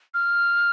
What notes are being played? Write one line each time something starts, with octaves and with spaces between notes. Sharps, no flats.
F6